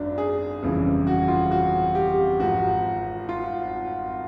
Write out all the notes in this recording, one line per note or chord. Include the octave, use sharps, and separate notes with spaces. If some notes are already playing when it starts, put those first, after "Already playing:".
Already playing: G#1 F#2 D4
G#4
G1 F2 C#3 E3
F#4
F4
F#4
G4
G#1 G#2 F3 F#4
F4